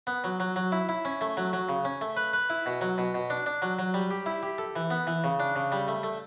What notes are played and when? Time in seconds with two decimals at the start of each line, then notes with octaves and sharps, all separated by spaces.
0.07 B3
0.24 F#3
0.40 F#3
0.56 F#3
0.72 E4
0.89 E4
1.05 C#4
1.21 A3
1.37 F#3
1.53 F#3
1.69 C#3
1.85 C#4
2.01 A3
2.17 B4
2.33 B4
2.50 E4
2.66 B2
2.81 F#3
2.98 B2
3.14 B2
3.30 D4
3.46 D4
3.62 F#3
3.79 F#3
3.94 G3
4.11 G4
4.26 E4
4.43 G4
4.58 A4
4.76 E3
4.91 B3
5.07 E3
5.24 C#3
5.40 D4
5.56 C#3
5.72 G3
5.88 A3
6.03 A3